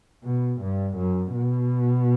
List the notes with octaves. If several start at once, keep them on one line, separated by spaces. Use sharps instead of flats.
B2
G2
F#2
B2